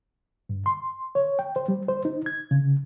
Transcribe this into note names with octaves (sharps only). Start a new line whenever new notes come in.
G2
C6
C#5
G5
C5
G3
C5
D#4
G#6
C#3